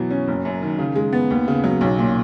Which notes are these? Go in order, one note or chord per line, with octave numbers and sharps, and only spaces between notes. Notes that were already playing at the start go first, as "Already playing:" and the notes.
Already playing: B2 E3 F#3
C#4
F#1
F#2
D#3
C#3
G#3
B3
D#2
C#3
F#3
B1
A#2